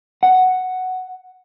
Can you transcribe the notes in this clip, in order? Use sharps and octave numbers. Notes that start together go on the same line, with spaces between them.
F#5